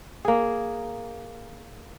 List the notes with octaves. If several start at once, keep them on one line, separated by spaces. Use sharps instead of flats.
A#3 G#4